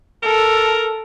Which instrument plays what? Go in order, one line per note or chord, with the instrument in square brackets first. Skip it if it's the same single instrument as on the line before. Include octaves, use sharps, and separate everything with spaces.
[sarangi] A4 [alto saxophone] A#4